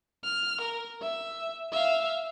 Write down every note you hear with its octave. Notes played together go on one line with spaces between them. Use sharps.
F6
A#4
E5
E5 F5